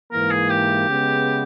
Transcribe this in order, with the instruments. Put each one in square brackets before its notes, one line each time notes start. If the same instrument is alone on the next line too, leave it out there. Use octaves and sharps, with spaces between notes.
[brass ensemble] G#2 E3 A#3 [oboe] A#4
[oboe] G#4
G4
[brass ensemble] C#3 G#3 B3